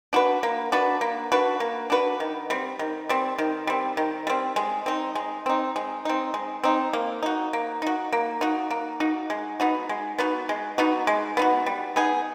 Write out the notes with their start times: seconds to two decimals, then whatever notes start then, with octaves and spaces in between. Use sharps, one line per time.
0.13 D4 F#4 B4
0.43 A#3
0.72 D4 F#4 B4
1.01 A#3
1.32 D4 F#4 B4
1.60 A#3
1.90 D4 F#4 B4
2.20 D#3
2.50 G3 C4
2.79 D#3
3.09 G3 C4
3.38 D#3
3.67 G3 C4
3.97 D#3
4.27 G3 C4
4.56 G#3
4.86 C4 D#4
5.15 G#3
5.46 C4 D#4
5.76 G#3
6.05 C4 D#4
6.34 G#3
6.64 C4 D#4
6.93 A#3
7.23 D#4 F#4
7.53 A#3
7.82 D#4 F#4
8.13 A#3
8.41 D#4 F#4
8.71 A#3
9.00 D#4 F#4
9.30 G#3
9.60 B3 D#4 F#4
9.89 G#3
10.18 B3 D#4 F#4
10.49 G#3
10.78 B3 D#4 F#4
11.07 G#3
11.37 B3 D#4 F#4
11.66 G3
11.96 B3 D#4 G#4